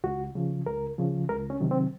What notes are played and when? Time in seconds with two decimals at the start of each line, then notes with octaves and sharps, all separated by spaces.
0.04 C#2 F#4
0.35 C#3 F3
0.66 C#2 A#4
0.98 C#3 F3
1.29 C#2 A#4
1.50 C#4
1.60 C3 D#3 F#3
1.71 C4